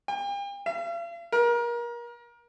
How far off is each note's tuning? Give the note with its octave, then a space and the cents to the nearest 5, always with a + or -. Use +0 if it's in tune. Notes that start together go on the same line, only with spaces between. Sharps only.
G5 +40
F5 -45
A#4 +30